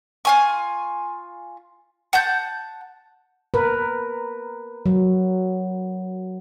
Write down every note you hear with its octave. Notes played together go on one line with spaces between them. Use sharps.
F4 G#5 C#6
F#5 A5 G6
A#4 B4
F#3